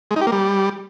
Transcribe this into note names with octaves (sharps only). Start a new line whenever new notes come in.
G#3
D#4
G4
A#3
G3